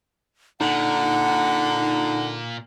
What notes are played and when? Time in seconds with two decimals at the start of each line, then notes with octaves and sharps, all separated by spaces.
0.61 A#2 D3 D#4 F#5